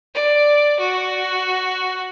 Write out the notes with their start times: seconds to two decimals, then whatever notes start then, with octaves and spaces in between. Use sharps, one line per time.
0.15 D5
0.80 F#4